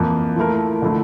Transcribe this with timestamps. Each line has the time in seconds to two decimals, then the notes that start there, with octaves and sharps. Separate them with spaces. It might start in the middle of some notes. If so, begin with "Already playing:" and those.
Already playing: F2 E3 A#3
0.36 F3 A3 E4 A#4
0.82 D3 F3 A3 E4